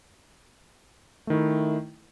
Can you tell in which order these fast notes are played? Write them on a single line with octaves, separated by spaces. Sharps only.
A3 D#3 E4